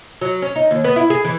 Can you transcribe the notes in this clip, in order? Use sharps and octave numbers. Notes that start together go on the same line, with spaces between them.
F#3
C#4
D#4
D#2
B3
E4
G#4
E3